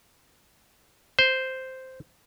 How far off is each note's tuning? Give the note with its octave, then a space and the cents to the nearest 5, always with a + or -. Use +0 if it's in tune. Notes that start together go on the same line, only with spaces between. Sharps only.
C5 -5